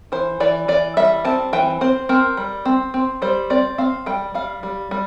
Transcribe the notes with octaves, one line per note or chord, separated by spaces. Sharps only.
E3 C5
E3 D5
E3 D5
G3 E5
C4 A5
E3 G5
C4 C5
C4 A#4
G3
C4
C4
G3 C5
C4 D5
C4 F5
G3 G5
G3 F5
G3
G3